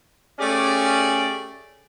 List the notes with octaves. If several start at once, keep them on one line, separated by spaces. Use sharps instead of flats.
A3 C#4 G4 G#4 D5